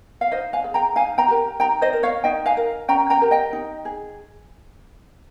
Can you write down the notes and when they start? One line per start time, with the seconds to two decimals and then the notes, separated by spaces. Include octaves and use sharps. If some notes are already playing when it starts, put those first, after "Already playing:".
0.21 F5
0.32 D#4 C5 D#5
0.53 F5 G#5
0.64 G#4
0.74 G5 A#5
0.96 D#4 F5 G#5
1.18 G5 A#5
1.28 G4 A#4
1.60 D#4 G5 A#5
1.82 C5 D#5
1.93 A#4
2.03 C#5 F5
2.24 D#4 D#5 G5
2.46 F5 G#5
2.57 A#4
2.88 C#4 G5 A#5
3.10 G5 A#5
3.21 G4 A#4
3.31 D#5 G5
3.53 D#4
3.85 G#4